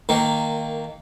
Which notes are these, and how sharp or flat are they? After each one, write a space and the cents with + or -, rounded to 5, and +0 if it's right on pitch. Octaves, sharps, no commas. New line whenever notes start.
D#3 +0 A#3 -15